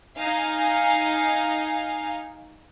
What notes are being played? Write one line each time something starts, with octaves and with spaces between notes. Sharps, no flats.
D#4 F5 G#5